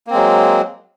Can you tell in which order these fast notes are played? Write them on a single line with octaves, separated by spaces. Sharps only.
A#3 C4 G#3 F#3